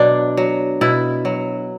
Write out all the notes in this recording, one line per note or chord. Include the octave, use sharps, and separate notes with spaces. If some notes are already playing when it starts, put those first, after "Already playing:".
Already playing: B2 F#3 D4
F#3
B2 E4
F#3